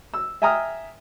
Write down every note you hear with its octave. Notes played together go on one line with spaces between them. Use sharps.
E6
E5 G5 G#5 A#5 D#6 F6